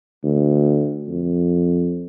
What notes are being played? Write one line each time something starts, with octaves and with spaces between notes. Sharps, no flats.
D2
F2